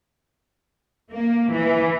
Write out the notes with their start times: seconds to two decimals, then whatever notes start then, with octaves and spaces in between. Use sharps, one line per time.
1.13 A#3
1.53 E3